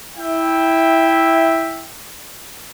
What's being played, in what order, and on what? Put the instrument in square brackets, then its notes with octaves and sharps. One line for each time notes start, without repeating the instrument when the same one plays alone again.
[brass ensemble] E4 E5 G5